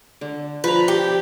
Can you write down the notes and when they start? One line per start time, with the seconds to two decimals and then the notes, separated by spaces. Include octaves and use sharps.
0.21 D3
0.64 F3 B4 A#5
0.88 G4